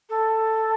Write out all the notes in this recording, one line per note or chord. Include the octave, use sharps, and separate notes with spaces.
A4